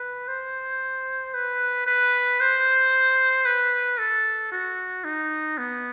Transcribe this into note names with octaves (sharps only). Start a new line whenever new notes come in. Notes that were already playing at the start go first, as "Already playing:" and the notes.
Already playing: B4
C5
B4
B4
C5
B4
A4
F#4
D#4
B3